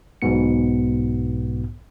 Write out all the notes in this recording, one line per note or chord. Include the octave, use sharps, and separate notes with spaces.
B1 G#2 B2 B3 C#7